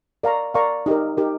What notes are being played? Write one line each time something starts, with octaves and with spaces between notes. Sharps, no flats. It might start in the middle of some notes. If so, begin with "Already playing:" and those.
A#4 D5 F5 A#5 C#6
A#4 D5 F5 A#5 C#6
D#4 G4 A#4
D#4 G4 A#4